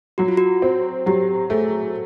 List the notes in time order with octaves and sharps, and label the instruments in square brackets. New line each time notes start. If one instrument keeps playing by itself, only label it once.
[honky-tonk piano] F#3 [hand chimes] F#4
[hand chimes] F4
F#4
[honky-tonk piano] C4
[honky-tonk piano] F#3 [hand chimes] G4
[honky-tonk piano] A3 [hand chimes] G#4